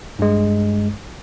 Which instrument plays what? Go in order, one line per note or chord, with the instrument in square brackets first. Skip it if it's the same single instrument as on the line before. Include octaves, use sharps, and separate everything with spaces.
[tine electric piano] G2 G#3